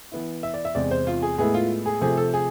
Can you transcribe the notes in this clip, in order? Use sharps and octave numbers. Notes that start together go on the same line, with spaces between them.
E3 B3 E4
E5
D5
E5
E2 C3 G#3 C4 D5
C5
F4
G#4
A2 G#3 B3 E4 G#4
F4
G#4
C3 F3 A3 C4 G#4
A4
G#4